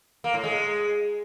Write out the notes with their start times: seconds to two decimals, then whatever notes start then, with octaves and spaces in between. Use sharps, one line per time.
0.24 A#3
0.34 A2
0.44 G#3